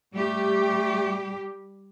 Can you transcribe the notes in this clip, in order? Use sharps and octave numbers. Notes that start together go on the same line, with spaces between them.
G3 A3 G4